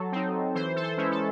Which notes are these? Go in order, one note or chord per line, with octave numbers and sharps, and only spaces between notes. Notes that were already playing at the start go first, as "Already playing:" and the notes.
Already playing: F#3 A4
C4 D#4
E3 C5
A4
C5
G#3 C#4 E4
A4